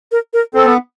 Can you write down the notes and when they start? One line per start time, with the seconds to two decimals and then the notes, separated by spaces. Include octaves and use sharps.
0.12 A#4
0.33 A#4
0.54 C4 A4
0.65 B3